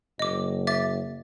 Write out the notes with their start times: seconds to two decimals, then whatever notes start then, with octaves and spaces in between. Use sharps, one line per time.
0.19 F#1 D#5 D6
0.67 E5 D6 A6